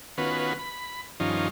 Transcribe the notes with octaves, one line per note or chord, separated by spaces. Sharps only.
D#3 B3 C#4 F4 F#4 B4
B5
G2 D#3 F3 C#4 D#4 F4